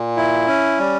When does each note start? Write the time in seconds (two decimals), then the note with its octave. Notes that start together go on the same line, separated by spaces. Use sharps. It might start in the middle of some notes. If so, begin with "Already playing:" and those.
Already playing: A#2
0.17 E4
0.48 C#4
0.79 G3